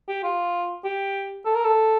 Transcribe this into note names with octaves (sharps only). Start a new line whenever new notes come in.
G4
F4
G4
A4
A#4
A4